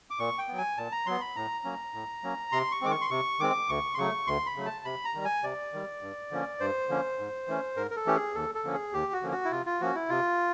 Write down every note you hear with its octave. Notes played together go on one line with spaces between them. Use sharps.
D6
A#2 C#6
G5
F#3 B3
G#5
A#2 A5
A#5
F#3 B3 C6
B5
A2 A#5
F#3 A#3 C#4
A2
F#3 A#3 C#4
C3 C6
C#6
D#3 G#3 C4 D6
C#6
C6
C3 C#6
D#3 G#3 C4 D6
D2 C#6
C6
C#3 F#3 A3 C#6
D2 C6
B5
C#3 F#3 A3
A5
C3 B5
A#5
D#3 G3
G#5
C3 D5
D#3 G3
G2
D3 F3 A#3 C#4
G2 C5
D3 F3 A#3 C#4
G#2
E3 A3 C#4
G#2 A#4
A#4
A4
E3 A3 C#4 G4
G#4
D#2 A4
A4
D3 F3 A#3 C#4
G#4
D#2 G4
F#4
D3 F3 A#3 C#4
F#4
E4
C3 F4
F4
F3 A#3 C#4 F#4
E4
C3 F4